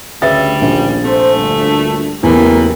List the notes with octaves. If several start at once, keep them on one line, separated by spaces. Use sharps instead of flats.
D2 C#3 G3 B4 E5 A6
D#1 A#1
C3 A3 C5
D2 G2 A#2
F#1 E2 A2 E3 G4 A#4